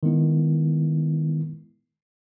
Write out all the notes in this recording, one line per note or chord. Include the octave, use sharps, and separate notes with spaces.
D#3 G#3 B3 E4